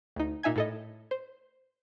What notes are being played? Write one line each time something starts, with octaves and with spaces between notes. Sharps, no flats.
D2 D#4
A#2 D#4 E5 G#5 G#6
A2 A4 D#5
C5